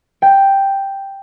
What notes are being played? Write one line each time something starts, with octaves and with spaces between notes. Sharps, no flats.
G5